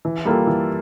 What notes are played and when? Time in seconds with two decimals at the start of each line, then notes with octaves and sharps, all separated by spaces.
0.05 E3
0.25 G3 A#3 F4 A4
0.47 E3